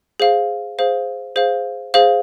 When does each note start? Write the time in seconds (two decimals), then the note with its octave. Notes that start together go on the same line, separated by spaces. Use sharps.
0.20 G#4 C5 F5
0.79 G#4 C5 F5
1.36 G#4 C5 F5
1.94 G#4 C5 F5